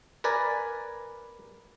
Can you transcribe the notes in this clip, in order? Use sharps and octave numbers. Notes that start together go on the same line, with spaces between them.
A#4 B4 D5 G#5